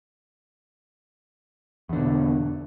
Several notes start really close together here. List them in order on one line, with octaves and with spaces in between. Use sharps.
E2 D3 B2